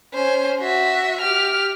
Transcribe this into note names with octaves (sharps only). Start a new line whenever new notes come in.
C#4 C5
F#4 E5
G4 F6